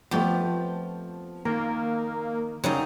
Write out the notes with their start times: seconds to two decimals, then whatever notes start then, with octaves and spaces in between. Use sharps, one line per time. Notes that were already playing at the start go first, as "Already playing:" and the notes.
0.11 F2 F3 A3 B3 G4
1.45 D#3 A#3
2.64 C#3 F#3 G3 D#4